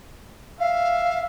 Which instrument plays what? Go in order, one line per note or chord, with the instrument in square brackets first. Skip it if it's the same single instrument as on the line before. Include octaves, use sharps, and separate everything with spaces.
[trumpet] E5 [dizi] F5